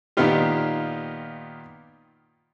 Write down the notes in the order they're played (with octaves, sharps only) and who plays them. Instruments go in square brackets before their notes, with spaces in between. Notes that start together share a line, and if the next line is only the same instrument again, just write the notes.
[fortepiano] A#2 D#3 B3 D#4 F4 G4